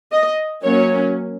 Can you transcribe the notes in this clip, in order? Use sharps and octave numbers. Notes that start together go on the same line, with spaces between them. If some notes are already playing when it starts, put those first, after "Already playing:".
D#5
F#3 A#3 C#4 C#5